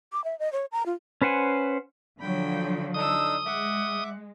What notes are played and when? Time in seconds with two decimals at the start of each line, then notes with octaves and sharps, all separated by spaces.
0.13 D6
0.24 E5
0.39 D#5
0.53 C#5
0.72 A#5
0.86 F4
1.22 C#4 B4 C5 F#5 G#5
2.20 D3 F3 F#3 G5 B5
2.94 D4 D#4 A4 D#6 E6
3.46 G#3 E5 F#5 D6